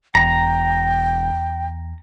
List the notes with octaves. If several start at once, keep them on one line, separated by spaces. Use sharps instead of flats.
E1 E2 G5 A#5